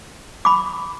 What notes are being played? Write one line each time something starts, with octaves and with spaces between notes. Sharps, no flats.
B5 D6